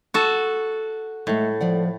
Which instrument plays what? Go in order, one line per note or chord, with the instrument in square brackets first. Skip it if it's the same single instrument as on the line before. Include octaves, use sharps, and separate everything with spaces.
[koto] F#4 A4
[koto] A2 [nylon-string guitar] G#3 A3
[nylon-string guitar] F3 D5 F#5